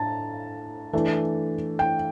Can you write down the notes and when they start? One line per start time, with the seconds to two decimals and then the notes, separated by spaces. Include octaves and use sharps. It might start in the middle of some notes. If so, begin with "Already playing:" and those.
Already playing: A2 D4 A5 A#5
0.93 E3 A3 D4
1.79 G5